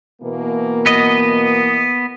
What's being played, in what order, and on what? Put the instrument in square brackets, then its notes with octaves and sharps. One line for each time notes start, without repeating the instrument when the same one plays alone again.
[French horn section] B2 E3 A#3
[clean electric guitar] B3 D#5